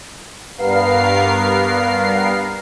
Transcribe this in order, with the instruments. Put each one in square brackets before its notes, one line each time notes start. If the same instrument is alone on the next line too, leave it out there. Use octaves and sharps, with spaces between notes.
[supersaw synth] G2 B3 A#4 F5 C7